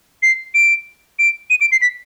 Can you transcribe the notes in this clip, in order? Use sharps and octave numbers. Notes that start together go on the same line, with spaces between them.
C7
D7
D7
D#7
D7
C7
B6